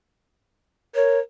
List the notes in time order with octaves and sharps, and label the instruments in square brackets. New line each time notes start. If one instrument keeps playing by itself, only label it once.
[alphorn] A#4 [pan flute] C#5